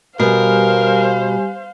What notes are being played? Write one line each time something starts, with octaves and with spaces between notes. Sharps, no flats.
B2 G3 G4 A#4 C5 F5 G#5